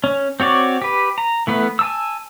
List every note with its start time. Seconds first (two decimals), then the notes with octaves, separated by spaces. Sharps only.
0.04 C#4
0.40 C4 F#4 C#5 D5
0.82 G4 B4
1.18 A#5
1.47 E3 A3 B3 B4
1.79 G#5 A5 E6